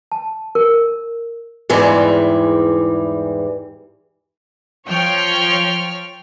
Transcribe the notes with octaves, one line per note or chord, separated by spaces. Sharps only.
A5
A#4
E2 G#2 E3 G3
F3 C#5 G5 F6